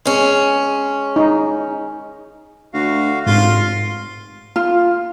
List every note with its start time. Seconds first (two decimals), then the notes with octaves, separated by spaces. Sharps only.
0.05 G#3 C#4
1.16 D#4
2.74 D2 F#4 F5
3.27 F1 G#2 F4 C6
4.56 F4